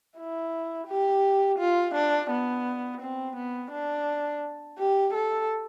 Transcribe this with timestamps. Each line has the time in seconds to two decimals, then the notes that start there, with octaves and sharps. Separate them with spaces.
0.17 E4
0.88 G4
1.59 F4
1.95 D4
2.30 B3
3.01 C4
3.37 B3
3.72 D4
4.78 G4
5.14 A4